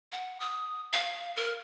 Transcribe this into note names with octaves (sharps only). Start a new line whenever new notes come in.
F#5
D#6
F5
A#4